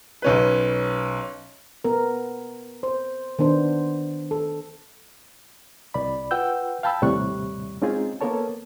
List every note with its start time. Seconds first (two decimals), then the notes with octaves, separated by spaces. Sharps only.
0.22 B1 C#4 B4
1.84 B3 A#4
2.83 C5
3.39 D#3 B3 D4 C5
4.31 A4
5.94 C2 D5 B5
6.31 F4 B4 F#5 G5 E6 G6
6.83 F5 G5 A5 B5 E6
7.02 D#2 A2 C3 G3 C#6 F#6
7.82 G#3 C4 C#4 D#4 F4 G#4
8.21 A#3 B3 A4 A#4 C#5 A5